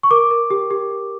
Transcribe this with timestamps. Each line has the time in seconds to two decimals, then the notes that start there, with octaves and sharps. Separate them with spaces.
0.03 C#6
0.11 A#4 D6
0.31 A#4
0.50 G4
0.71 G4
0.91 G4